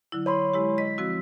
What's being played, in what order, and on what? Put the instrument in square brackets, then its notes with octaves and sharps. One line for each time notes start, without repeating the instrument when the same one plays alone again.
[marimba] D3 F#3 E4
[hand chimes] C#5 B5 C6
[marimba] G#3 E4 G4
[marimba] D#5 [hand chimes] B6
[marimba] F3 C4 F#4 [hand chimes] E6